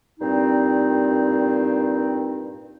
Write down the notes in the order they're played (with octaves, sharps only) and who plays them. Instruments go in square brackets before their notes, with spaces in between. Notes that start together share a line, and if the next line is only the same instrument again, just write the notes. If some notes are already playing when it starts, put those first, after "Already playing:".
[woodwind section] G2 A#2 C4 D#4